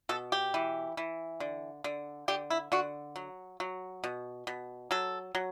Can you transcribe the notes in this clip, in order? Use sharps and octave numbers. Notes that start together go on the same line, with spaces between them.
B2 A4
G4
E3
E3
D3
D3
D3 G4
E4
D3 F#4
F#3
F#3
B2
B2
F#3 A4
F#3